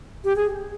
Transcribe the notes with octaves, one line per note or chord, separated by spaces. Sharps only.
G4
G#4